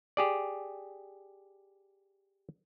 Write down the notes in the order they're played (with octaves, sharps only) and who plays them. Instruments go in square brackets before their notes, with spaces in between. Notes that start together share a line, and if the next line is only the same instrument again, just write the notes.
[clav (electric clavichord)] G4 G#4 D5